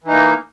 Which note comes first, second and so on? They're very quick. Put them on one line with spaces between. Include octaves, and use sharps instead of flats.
E3 D#4 A#3